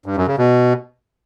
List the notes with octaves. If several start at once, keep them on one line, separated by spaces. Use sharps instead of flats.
G2
F#2
C#3
B2